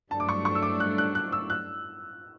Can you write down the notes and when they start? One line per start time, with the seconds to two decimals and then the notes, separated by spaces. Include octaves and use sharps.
0.10 G2 F#3 A3 D4 A5
0.20 D6
0.29 C#6
0.45 C#6
0.55 E6
0.63 D6
0.80 F#6
0.98 F#6
1.15 F#6
1.32 E6
1.50 F#6